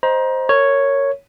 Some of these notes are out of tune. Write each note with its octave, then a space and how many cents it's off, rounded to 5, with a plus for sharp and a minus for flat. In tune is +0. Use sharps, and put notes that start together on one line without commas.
C5 +0 D#5 +0 A#5 +30
A#4 -20 C#5 +0